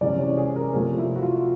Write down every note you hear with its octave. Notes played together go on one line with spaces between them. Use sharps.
C3 E3 G#3 C#4 D5
C#5
G#4
A#4
C3 F3 A3 G#4
E4
F#4
F4